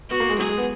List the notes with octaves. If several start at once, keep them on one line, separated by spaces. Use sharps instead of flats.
B3 F#4
A#3
G#3
F#3 G#4
G#3
B3